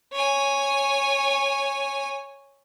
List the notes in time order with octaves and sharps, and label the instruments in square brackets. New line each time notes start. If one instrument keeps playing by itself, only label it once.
[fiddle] C#5 G#5